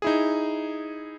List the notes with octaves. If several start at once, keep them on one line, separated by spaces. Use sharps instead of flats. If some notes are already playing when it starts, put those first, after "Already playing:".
D#4 E4 G#4